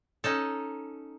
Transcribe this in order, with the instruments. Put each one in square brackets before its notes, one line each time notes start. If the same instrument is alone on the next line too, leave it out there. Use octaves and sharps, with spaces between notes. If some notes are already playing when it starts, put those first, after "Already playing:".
[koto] C#4 D#4 A4